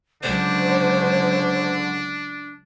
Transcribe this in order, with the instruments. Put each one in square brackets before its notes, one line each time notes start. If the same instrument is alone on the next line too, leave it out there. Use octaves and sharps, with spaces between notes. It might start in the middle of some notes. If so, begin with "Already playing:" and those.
[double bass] C#2 F#3 [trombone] D3 [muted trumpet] D4 [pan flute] C5